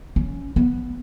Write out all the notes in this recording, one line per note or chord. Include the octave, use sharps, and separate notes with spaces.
C#4
B3